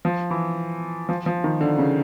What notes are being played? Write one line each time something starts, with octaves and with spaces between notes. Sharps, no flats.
F3
E3
F3
F3
D#3
D3
C#3